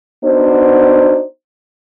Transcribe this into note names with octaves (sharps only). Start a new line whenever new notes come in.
B3 D4 D#4 F#4 C5